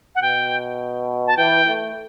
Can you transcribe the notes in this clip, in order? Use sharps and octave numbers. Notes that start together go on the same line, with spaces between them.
F#5
B2 G5
A5
E3 G5
A3